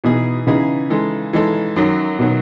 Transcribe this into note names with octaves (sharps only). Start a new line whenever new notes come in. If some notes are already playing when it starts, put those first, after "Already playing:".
B2 E3 B3 D#4 G#4
C#3 E3 B3 D#4 G#4
E3 G#3 D#4 A4
E3 G#3 D#4 A4
F#2 D#3 F#3
B2 D#3 F#3